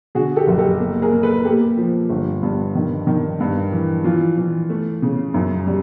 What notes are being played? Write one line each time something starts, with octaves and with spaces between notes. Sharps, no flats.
D3 F#4 G#4
G4 A4
F#1
G4 A4
A#3
G#4 A#4
A#3
A4 B4
A#4
A#3 G4 A4
F3
G1
G2
D#3
D#3
G2
E3
E3 F4
E3
A3
C#3
F#2
G3